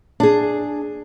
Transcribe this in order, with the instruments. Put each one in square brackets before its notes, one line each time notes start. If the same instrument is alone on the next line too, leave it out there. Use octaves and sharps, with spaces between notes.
[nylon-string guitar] D4 G#4